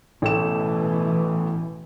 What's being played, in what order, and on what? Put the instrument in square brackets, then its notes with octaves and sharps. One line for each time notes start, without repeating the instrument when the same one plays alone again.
[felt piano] A1 A3 E7 [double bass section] B2 E3